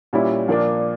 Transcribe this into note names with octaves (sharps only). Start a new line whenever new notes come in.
A#2 G3 C#4 E4
A#2 F3 A#3 D4